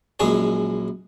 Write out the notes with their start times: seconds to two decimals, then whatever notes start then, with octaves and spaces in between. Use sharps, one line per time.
0.20 A#1 F#2 G#3 G#4 C#5